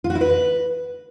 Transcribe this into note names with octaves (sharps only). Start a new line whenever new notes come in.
F4
F#4
E4
B4